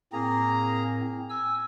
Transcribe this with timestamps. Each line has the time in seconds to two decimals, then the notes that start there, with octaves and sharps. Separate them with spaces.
0.13 A2 A#3 C4 G#4 A#5
1.30 G#5 E6